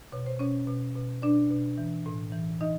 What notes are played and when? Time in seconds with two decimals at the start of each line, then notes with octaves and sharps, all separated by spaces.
0.12 B2 C#5
0.26 C5
0.39 B2 C#4 C#5
0.67 B2
0.95 B2
1.22 B2 D4 D5
1.50 B2
1.78 E3
2.06 A2
2.32 E3
2.60 E3 D#4 D#5